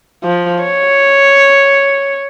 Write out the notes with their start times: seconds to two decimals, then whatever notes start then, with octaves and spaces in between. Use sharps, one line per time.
0.24 F3
0.63 C#5